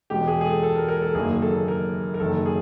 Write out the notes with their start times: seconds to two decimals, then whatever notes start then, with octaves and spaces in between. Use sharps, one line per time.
0.10 E1 E2 B2 G#3 G4
0.27 G#4
0.41 G#4
0.46 A4
0.63 A4
0.76 A#4
0.88 A#4
1.02 A4
1.15 F#1 F#2 D#3 F#3 A#3 G#4
1.42 A4
1.68 A#4
2.14 A#4
2.20 F#1 F#2 D#3 A4
2.46 G#4